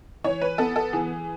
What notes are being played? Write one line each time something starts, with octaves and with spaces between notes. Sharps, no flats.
E3 C#5
B4
B3 A4
A4
E3 G#4